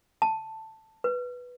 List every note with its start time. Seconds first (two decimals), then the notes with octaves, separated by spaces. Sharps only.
0.22 A5
1.04 B4